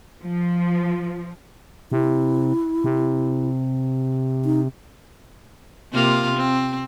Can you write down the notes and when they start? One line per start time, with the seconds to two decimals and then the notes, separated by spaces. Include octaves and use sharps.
0.22 F3
1.92 C3 E4
2.84 C3
4.45 D#4
5.92 C3 A#3 F4
6.36 C4